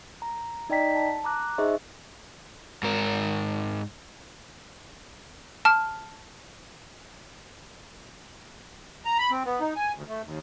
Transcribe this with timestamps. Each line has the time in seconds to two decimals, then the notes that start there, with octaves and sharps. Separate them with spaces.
0.22 A#5
0.70 D#4 D5 D#5 G5 A#5 B6
0.95 A5
1.24 A#5 D6 F#6
1.58 D#4 G#4 C5 D#5 E5 C#6
2.83 G#2 A#4
5.65 A5 F6
9.05 A#5
9.18 B5
9.31 C4
9.45 B3
9.60 D#4
9.76 G#5
9.95 D2
10.08 A3
10.24 D#2